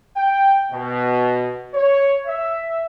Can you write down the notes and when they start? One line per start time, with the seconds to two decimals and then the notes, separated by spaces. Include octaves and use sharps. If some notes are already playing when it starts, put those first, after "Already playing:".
0.16 G5
0.71 B2
1.74 C#5
2.26 E5